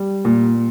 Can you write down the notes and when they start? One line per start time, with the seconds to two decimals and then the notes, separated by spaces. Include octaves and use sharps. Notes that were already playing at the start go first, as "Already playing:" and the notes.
Already playing: G3
0.25 A#2